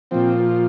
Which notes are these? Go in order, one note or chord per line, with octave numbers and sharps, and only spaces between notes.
A#2 F3 C4